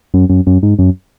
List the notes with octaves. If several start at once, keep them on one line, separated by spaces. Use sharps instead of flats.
F#2
F#2
F#2
G#2
F#2